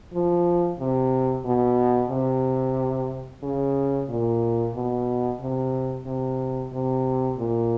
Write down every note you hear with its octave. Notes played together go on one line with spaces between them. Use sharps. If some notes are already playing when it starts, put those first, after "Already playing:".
F3
C3
B2
C3
C#3
A#2
B2
C3
C3
C3
A#2